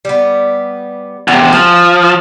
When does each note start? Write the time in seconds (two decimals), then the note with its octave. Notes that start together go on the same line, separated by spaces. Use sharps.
0.05 G3 B3
1.28 E2 C3 F#5
1.52 F3 G#5